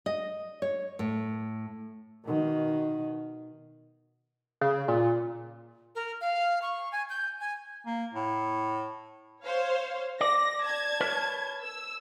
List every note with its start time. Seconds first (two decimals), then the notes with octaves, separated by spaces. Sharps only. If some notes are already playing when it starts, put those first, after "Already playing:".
0.06 D#5
0.62 C#5
0.99 A2
2.24 B2 D#3
4.61 C#3
4.88 A#2
5.95 A#4
6.21 F5
6.62 C#6
6.92 G#5
7.10 G6
7.40 G#5
7.86 A#3
8.13 A2
9.44 C5 C#5 F5
10.21 D5 A#6
10.62 A5 G#6
11.01 A#4 B4 C#5
11.63 E6